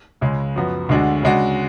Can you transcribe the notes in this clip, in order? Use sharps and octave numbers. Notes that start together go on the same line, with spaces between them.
C#2 C#3 G#3
F#2 F3 B3 F#4
D2 D3 G#3 D4 F#4
C#3 G#3 D4 F#4